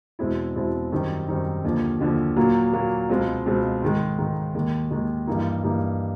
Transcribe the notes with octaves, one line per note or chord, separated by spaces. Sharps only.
E2 B2 G#3 C4 E4
E2 B2 G#3 C4 E4
F#2 D#3 G3 C4 D#4
F#2 D#3 G3 C4 D#4
D#2 D3 F3
D#2 D3 F3
A#2 F#3 A#3
A#2 F#3 A#3
C#2 B2 G#3 C4 F4
C#2 B2 G#3 C4 F4
G#2 D#3 G#3
G#2 D#3 G#3
D#2 D#3 G#3
D#2 D#3 G#3
G2 E3 G3 A#3 D#4
G2 E3 G3 A#3 D#4